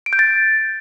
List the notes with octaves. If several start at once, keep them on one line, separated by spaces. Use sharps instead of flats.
D7
G6
A6